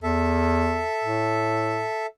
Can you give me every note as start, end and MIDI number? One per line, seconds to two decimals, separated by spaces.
0.03 0.86 40
0.03 2.06 69
0.03 2.06 76
1.04 1.86 45